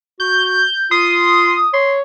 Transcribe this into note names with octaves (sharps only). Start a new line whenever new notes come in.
F#4 G6
F4 C6 D#6
C#5 C6